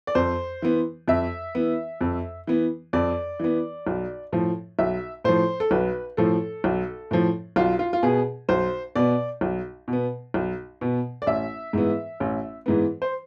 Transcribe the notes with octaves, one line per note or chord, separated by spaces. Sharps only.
D5
F2 C5
E3 B3
F2 E5
E3 B3
F2
E3 B3
F2 D5
E3 B3
B1
A2 F3
B1 E5
A2 F3 C5
A4
B1 B4
A2 F3 A4
B1
A2 F3
B1 F4
F4
F4
B2 B3 G#4
B1 C5
B2 B3 D5
B1
B2
B3
B1
B2 B3
D5
A1 E5
G#2 E3 B3
A1
G#2 E3 B3
C5